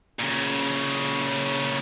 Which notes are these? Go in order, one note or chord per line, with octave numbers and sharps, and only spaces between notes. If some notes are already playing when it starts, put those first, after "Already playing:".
A#2 C#3